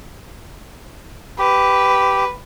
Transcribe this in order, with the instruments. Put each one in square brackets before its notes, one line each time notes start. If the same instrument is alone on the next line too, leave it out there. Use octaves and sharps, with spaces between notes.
[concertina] G4 [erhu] B4